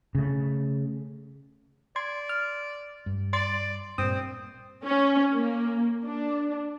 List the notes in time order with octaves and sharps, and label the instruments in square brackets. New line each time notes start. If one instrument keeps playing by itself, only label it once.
[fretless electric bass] C#3 A3
[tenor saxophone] D5 [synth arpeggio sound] C6 G#6
[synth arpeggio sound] F6
[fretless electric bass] G2
[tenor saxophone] D5 [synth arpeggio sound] C6 A6
[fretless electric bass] G2 A#2 [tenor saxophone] C4 [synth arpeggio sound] D#6
[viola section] C#4
A#3
D4